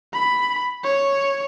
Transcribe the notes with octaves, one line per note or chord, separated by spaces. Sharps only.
B5
C#5